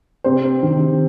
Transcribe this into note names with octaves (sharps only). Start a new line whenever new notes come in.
C3 C5
D#3